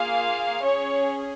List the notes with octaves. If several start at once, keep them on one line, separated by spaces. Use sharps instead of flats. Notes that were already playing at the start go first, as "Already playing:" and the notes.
Already playing: A#3 F4 G#4 F5
C#4 G#4 C#5